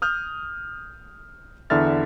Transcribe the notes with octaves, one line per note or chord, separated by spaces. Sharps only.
D#6 F6 G6
E2 D3 E4 E5 F6 A6